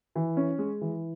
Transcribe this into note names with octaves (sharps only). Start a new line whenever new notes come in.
E3
C#4
G#3
E3